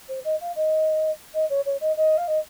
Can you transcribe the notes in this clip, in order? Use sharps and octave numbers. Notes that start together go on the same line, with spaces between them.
C5
D#5
F5
D#5
D#5
C#5
C#5
D#5
D#5
F5
D#5